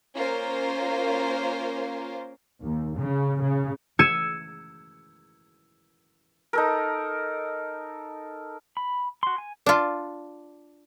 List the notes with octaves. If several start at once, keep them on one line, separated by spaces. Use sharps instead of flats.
A#3 C#4 F4 A#4 C5
D#2
C#3
C#3
E6 G#6 C#7 D#7 E7
D#4 A4 A#4
B5
F#4 C6
G#5
D4 F4